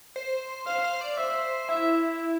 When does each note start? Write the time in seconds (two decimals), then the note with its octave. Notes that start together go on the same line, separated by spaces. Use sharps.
0.16 C5
0.66 C5 F5
0.84 C5
1.01 D5
1.17 C5 E5
1.69 E4 E5